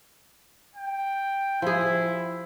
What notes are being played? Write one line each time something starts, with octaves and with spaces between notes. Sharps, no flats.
G5
F3 E4 G#4